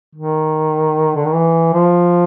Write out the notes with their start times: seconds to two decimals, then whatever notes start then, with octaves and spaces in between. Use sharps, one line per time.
0.15 D#3
1.15 D3
1.25 D#3
1.34 E3
1.73 F3